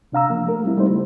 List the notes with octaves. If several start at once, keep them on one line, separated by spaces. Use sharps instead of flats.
C3 D4 F5 A#5 E6
F3 A#3
A3 A#4
G3 C4 E4
G3 A3 C4 D#4 C5
C#3